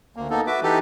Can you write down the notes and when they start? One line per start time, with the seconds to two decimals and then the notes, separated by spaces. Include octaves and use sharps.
0.16 D2 A#3
0.30 A#3 B3 D#4 A4
0.47 F#4 B4 E5 D6
0.63 E3 D#4 G4 A4 B4